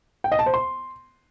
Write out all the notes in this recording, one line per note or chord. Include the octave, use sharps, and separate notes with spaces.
G5
D#5
A5
C5
C6